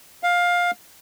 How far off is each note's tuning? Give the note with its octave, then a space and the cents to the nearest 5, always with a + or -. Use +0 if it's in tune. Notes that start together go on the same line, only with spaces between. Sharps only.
F5 +15